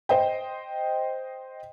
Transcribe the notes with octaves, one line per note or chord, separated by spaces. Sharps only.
C5 D#5 G5